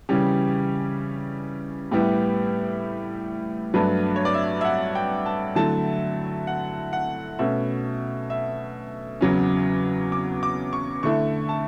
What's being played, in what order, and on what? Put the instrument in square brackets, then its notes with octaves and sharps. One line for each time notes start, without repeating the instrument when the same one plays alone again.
[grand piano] C#3 E3 G3 C#4 G4
A2 G3 B3 E4 G4
G2 F#3 A3 D4 B4
C#5
D5
E5
E5
F#5
G5
A5
D3 F#3 A3 E4 A5
F#5
F#5
B2 A3 C#4 E5
E5
E2 C#3 F#3 C#4
D6
D6
C#6
D3 A3 E4 C#6
A5